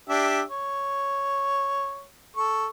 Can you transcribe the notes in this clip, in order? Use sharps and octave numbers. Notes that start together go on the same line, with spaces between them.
D4 G4 E5
C#5
A4 C#6